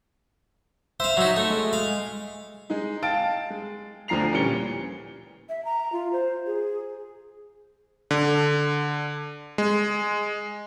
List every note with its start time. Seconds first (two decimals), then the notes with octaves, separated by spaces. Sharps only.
1.00 C5 E5 F5
1.17 F#3 D#4
1.36 A3
1.50 G#3
1.73 F5
2.70 G#3 D#4
3.03 F5 G5 A5 A6 D7
3.50 G#3
4.08 D2 D3 F3 A#5 C7 F7
4.33 A#2 E3 G3 C#4 C#7 G7
5.49 E5
5.65 A#5
5.92 F4
6.13 C5
6.46 G#4
8.11 D3
9.58 G#3